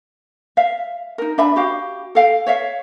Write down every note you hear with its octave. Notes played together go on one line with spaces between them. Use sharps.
E5 F5
D#4 A#4
D4 E5 B5
F#4 G4 F5
A4 F5 G5
C#5 E5 F5